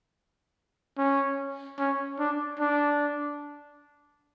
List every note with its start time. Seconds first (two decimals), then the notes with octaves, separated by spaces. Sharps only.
0.98 C#4
1.79 C#4
2.19 D4
2.59 D4